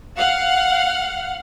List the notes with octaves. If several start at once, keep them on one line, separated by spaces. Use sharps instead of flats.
F5 F#5